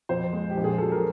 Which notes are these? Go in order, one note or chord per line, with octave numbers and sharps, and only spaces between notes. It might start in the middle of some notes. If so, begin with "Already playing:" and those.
F2 C5
G#3
G4
A#1
G#4
F#3 A4
A#4